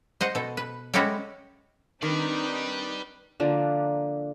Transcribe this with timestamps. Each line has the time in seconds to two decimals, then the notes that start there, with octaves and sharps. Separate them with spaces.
0.21 C5 D#5 F#5
0.35 B2 A4
0.57 B4
0.94 G#3 C#4 E4 F#4 G4 A4
2.03 D#3 C4 D4 D#4 G4 B4 D5
3.40 D3 F3 A#3 D4